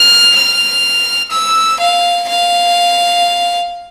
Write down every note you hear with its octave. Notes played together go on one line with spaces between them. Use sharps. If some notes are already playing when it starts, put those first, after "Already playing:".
Already playing: F6
F6
E6
F5
F5